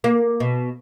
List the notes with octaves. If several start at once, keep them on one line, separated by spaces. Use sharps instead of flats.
A#3
B2